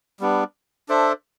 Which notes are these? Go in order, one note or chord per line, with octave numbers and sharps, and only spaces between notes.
G3 B3 D4
D4 A4 C5 E5